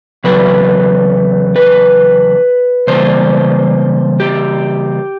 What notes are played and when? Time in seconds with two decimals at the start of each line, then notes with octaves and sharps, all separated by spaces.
0.24 E2 C#3 F#3 A3 B4
1.56 B4
2.87 C#3 E3 G3 A#3 C5
4.20 G4